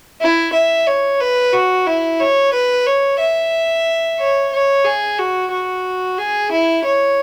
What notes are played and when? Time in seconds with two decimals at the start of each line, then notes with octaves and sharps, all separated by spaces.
0.21 E4
0.53 E5
0.87 C#5
1.20 B4
1.53 F#4
1.87 E4
2.20 C#5
2.53 B4
2.87 C#5
3.20 E5
4.19 C#5
4.53 C#5
4.85 G#4
5.19 F#4
5.52 F#4
6.19 G#4
6.51 E4
6.85 C#5